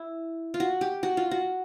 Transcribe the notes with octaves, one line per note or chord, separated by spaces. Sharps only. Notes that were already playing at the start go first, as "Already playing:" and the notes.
Already playing: E4
F4
F#4
G4
F#4
F4
F#4